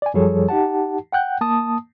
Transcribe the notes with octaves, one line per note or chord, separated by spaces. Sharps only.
D5 G#5
F#2 F3 G3 G#4 A4 C#5
D#4 G4 F#5 A5
F#5 G5 F#6 G6
A#3 A5 D#6